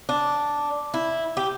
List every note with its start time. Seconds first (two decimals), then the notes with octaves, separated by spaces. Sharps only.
0.09 D4
0.94 E4
1.37 G4